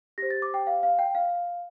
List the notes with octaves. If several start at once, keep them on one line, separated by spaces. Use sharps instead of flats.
G4 C5 A#6
A6
D6
G5
F5
F5
G5
F5